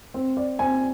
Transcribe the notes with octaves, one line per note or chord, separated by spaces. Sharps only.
C4
D5
C4 G#5